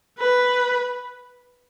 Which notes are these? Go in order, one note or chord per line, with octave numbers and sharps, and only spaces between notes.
B4